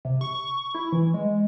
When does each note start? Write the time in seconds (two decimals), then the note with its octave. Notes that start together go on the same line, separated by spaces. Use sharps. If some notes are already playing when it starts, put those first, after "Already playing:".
0.05 C3
0.21 C#6
0.75 E4
0.92 E3
1.14 G#3